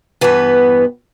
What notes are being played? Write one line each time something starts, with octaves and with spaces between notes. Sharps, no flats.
G2 E3 B3 B4